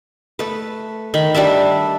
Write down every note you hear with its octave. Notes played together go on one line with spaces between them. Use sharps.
A3 B4
D#3 B5
G3 D4 D5 E5